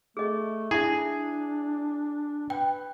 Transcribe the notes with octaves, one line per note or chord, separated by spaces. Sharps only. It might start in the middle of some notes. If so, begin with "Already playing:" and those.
A3 G#4 D#5
D4 E4 G#4 E5
B4 G5